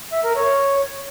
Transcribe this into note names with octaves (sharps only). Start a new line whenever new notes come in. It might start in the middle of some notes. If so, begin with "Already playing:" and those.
E5
A#4
C#5